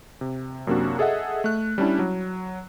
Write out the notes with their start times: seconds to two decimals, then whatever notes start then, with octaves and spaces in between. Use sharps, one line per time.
0.21 C3
0.67 F#2 C3 A#3 D4 F#4
0.99 G#4 A4 D#5 E5 F#5
1.44 A3 F#6
1.78 G3 C#4 D4 E4
1.99 F#3